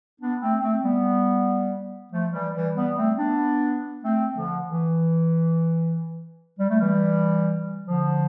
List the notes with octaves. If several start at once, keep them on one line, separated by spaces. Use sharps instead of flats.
B3 D4
A3 C4
A3 C4
G3 B3
F3 A3
E3 G3
E3 G3
G3 B3
A3 C4
B3 D4
A3 C4
D3 F3
E3
G3
A3
E3 G3
D3 F3